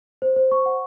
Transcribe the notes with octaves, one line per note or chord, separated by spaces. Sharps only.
C5
C5
C#6
F#5